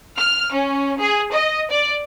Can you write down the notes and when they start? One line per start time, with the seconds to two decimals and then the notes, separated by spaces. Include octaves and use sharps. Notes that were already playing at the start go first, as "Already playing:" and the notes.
0.18 F6
0.56 C#4
1.00 G#4
1.32 D#5
1.71 D5